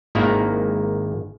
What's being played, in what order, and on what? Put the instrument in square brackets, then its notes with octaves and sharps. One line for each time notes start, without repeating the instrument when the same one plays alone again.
[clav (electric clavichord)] G#1 D#3 A#3 E4